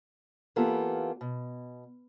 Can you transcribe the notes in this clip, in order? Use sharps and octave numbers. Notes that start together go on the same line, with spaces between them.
E3 A#3 B3 F4 G4 A4
B2